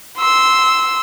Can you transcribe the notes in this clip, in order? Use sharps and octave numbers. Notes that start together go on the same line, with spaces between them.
C6 E6